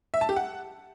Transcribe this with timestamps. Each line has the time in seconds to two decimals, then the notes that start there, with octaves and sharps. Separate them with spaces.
0.14 E5
0.21 A5
0.29 G4
0.36 F#5